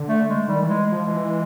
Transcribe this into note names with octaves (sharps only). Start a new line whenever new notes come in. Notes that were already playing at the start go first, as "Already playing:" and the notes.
Already playing: D3
A3
G#3
D#3 G3
E3
G#3
G#3
F3
E3